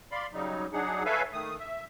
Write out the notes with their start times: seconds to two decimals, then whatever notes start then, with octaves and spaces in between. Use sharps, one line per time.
0.12 D5 F5 B5 C6
0.34 C#3 F#3 G3 D#4
0.73 F#3 D4 D#4 G#4 F#5
1.05 A4 B4 C#5 E5 F5 G#5
1.33 D#3 A3 D#6
1.59 E5